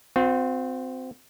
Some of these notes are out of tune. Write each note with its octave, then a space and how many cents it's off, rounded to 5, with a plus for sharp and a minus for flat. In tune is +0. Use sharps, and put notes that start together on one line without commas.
C4 -20 F4 +45